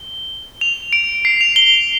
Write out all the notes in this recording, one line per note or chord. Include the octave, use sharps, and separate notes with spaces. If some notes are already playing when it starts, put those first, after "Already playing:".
Already playing: G7
F7
D7
C7
F7
G7